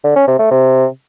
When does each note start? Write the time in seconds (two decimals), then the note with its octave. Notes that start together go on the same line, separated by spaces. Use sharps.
0.04 D3
0.16 C#4
0.27 C3
0.39 A3
0.51 C3